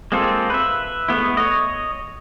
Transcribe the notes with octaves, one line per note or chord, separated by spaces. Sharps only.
G#3 A#3 C4 F4 A4
B4 E5
G#3 A3 B3 E4
C#5 D#5